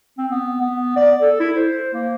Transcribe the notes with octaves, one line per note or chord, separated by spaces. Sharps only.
C4
B3
B3
D5
A4
E4
C5
A#3